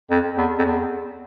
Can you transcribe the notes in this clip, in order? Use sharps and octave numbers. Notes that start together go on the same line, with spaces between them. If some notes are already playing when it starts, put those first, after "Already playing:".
F2
E2
F2
E2